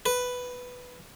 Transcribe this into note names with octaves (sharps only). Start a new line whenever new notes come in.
B4